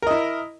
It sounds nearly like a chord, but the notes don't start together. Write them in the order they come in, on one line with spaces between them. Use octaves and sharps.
A#4 D#5 E4